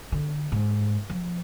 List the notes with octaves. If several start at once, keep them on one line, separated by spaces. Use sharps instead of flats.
D3
G#2
F3